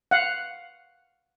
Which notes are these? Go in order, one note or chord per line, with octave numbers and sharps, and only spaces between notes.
F5 F#5